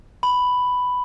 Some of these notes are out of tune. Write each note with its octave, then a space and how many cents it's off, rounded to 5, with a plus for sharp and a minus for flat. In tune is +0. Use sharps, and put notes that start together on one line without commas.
B5 +5